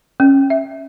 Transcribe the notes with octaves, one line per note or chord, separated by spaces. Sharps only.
C#4
E5